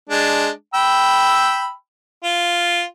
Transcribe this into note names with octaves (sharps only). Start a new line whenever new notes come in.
G#3 D4
G5 B5 E6
F4